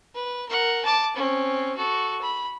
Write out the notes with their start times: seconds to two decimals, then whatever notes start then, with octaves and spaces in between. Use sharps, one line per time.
0.15 B4
0.49 A#4 F#5
0.85 A5 D6
1.16 C4 C#4
1.76 F#4 A4
2.22 B5